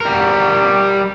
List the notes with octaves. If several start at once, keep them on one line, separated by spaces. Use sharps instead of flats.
G3 A#4